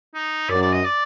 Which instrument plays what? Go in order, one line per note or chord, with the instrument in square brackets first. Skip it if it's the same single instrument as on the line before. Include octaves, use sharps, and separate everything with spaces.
[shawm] D#4
[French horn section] F#2 [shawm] D5
[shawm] D5
D#5
D5